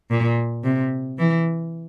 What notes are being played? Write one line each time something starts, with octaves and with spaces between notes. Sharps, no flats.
A#2
C3
E3